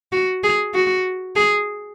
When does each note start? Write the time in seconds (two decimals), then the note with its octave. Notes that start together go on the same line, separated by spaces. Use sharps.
0.12 F#4
0.43 G#4
0.74 F#4
1.36 G#4